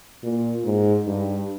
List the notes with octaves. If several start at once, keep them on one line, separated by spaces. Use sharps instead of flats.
A#2
G#2
G2